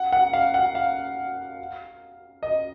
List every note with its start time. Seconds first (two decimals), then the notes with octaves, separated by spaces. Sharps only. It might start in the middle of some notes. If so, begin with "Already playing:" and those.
Already playing: F#5
0.12 F#5
0.33 F5
0.54 F#5
0.75 F5
2.43 D#5